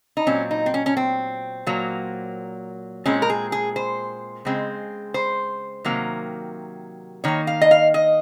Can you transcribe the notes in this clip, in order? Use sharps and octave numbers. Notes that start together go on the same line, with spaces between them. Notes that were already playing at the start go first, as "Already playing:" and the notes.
D#4
A#2 F#3 C4 C#4
D#4
C4
C#4
C#4
C4
A#2 F#3 A#3
A#2 G#3 C4 C#4
A#4
G#4
G#4
C5
C#3 G#3 C4
C5
C3 D#3 F#3 A#3
D#3 A#3 C#5
F5
D#5
F5
D#5